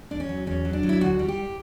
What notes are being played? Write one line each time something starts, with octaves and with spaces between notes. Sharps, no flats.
E2 D4
C#4
F#3
E2 C#4
F#3
D4
F#3
E4
D2 F#4
G3
G4